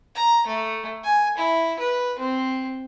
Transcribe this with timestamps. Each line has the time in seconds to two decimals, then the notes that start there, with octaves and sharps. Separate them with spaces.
0.15 A#5
0.47 A3
1.04 G#5
1.37 E4
1.79 B4
2.19 C4